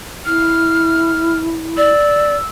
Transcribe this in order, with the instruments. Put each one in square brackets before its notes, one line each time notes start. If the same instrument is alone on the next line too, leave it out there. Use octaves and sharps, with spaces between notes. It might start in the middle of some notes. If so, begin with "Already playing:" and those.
[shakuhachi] E4 [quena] F6
[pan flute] D5 [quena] E6